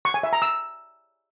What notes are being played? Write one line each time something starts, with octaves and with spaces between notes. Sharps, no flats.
C#6
G#5
E5
A#5
E6